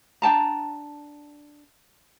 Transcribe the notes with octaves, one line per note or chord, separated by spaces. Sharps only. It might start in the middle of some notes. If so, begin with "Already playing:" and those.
D4 G5 A5 A#5